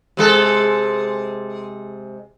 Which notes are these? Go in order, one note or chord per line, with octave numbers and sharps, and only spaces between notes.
C3 G#3 A4